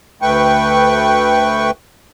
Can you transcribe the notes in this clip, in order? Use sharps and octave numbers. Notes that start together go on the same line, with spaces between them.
D2 A3 B4 G5 C#6